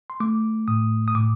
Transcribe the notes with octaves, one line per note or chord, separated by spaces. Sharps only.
C6
A3 D6
A2 D#6
D#6
A2 D6